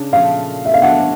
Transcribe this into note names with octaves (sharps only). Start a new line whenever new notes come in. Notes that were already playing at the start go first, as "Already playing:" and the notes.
Already playing: C#3 D4
A#2 F3 A3 F5
E5
F5
D3 F#3 A3 F#5